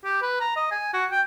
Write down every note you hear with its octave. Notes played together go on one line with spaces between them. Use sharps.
G4
B4
A#5
D#5
G#5
F#4
G5